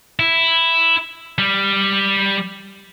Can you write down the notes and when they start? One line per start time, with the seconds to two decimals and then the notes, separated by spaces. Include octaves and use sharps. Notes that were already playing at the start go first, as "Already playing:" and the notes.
0.19 E4
1.38 G3